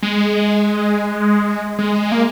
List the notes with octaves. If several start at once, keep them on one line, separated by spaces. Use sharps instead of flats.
G#3
G#3
A#3